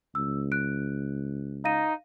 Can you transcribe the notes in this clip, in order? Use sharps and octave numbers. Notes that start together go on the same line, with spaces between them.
C#2 E6
F#6 D7
D#4 F5 A#6 D#7